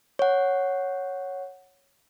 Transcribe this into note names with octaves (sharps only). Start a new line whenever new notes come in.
C#5 F#5